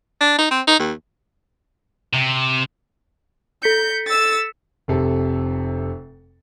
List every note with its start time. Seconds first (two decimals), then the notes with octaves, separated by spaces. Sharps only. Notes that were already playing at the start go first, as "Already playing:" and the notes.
0.21 D4
0.39 D#4
0.51 C4
0.68 D#4
0.80 D#2
2.13 C3
3.63 A4 G6 B6 C#7
4.08 E6 A6
4.88 F1 C3 A4